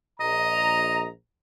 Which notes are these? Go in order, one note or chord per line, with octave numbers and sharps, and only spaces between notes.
A#1 D#5 A#5